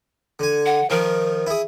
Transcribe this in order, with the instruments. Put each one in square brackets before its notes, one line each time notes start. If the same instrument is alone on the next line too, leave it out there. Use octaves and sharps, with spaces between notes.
[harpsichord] D3 G#5
[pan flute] F#5
[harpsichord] D#3 F3 [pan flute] A#4
[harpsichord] E4 G#4